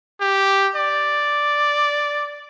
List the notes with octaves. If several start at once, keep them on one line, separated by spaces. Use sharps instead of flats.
G4
D5